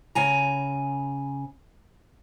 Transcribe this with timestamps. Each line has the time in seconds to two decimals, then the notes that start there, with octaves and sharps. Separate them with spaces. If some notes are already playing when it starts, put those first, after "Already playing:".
0.15 C#3 G#5 A#5